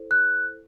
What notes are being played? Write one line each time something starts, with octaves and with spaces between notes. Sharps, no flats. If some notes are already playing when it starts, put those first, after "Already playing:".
Already playing: E4 A4 C5
F#6